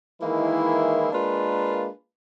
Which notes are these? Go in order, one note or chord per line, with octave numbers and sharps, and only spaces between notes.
D#3 E3 G#3 A#3 E4
G#3 A#3 D4 F4 A#4 B4